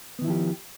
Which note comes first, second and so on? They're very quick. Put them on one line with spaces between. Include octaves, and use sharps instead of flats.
B3 D#3 E4 F3 G4